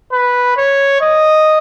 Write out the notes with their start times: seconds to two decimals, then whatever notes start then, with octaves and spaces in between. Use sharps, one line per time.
0.12 B4
0.57 C#5
1.01 D#5